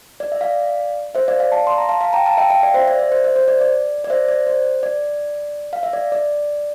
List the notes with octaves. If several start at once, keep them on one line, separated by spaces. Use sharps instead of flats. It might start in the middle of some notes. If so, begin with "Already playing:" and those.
D5
E5
D5 F5
C5 E5
D5 F5
D5 F5
F5 A5
C6
A#5
F5 A5
F5 A5
G5 A#5
F5 A5
E5 G5
E5 G5
D5 F5
C5 E5
D5
C5 E5
C5
C5 E5
C5
D5
D5
D5
C5 E5
D5
C5
D5
F5
E5
D5
D5